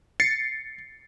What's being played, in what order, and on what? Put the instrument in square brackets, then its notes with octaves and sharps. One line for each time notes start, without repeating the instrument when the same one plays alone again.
[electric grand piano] A6 C7 C#7